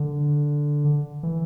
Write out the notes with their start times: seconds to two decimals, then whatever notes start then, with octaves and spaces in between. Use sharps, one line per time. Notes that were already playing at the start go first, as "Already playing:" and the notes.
Already playing: D3
1.23 E3